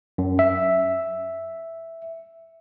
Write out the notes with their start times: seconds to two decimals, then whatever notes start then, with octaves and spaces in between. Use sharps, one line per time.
0.18 F#2
0.39 E5